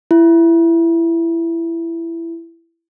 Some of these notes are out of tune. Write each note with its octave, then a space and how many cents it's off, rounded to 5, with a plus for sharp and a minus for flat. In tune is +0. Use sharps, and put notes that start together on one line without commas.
E4 +15